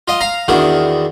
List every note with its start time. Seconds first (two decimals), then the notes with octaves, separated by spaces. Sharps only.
0.08 F4 D#5
0.20 F5 A#5
0.48 E2 D#3 D4 F#4